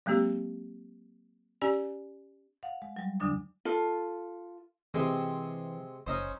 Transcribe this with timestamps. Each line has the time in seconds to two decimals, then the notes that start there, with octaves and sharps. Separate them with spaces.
0.06 F#3 G#3 A#3 C4 G4
1.61 C#4 G4 D5 G#5
2.63 F5 F#5
2.82 G#3
2.96 F#3 G3
3.20 E2 D3 F#3 D4 D#6
3.65 F4 A4
4.94 C3 E3 G#3 C4
6.07 F#1 C#4 D#4 C5